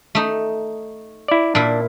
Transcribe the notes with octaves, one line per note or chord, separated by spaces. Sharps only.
A3 D#4
E4 D5
A#2 D4 E4